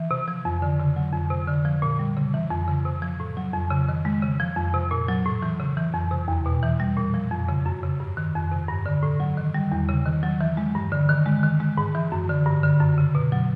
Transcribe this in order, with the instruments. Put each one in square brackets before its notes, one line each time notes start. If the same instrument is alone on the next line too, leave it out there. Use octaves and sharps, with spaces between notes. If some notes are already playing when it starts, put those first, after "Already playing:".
Already playing: [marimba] E3
C3
F3
F2
D3
C#3
F#3
F2
C3
D3
F3
A#2
G3
C#3
E3
F2
C#3
C3
F3
A2
F#3
F2
C#3
D#3
G#3
C#3
F3
F2
C3
A#2
F#3
A2
E3
C#3
E3
F2
C3
E2
B2
E3
G3
A#2
F3
F2
C#3
F#2
C#3
G2
D#3
F2
C3
G2
D3
A2
F#3
D#3
G3
E2
C#3
D#3
F#3
E3
G#3
G2
D3
D#3
G#3
D#3
G#3
G#2
E3
F#2
D3
G2
D3
F#2
C#3
B2
F#3